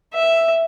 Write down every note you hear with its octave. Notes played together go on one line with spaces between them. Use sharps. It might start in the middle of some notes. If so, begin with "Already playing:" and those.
E5